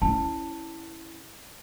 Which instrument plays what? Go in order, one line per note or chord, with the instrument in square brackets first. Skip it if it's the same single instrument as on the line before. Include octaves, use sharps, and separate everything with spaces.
[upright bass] C#4 E4 [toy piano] A5